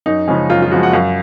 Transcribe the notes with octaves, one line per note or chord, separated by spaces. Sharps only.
F#2 D#4
C#3 F3 G#3 C#4
F#2 F4
F4
C#3 F3 G#3 F#4
F#5
F#2 F5